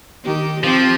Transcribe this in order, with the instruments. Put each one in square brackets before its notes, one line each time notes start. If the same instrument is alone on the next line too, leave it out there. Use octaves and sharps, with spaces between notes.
[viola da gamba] D#3 G4
[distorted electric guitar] F3 [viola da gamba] C4 G4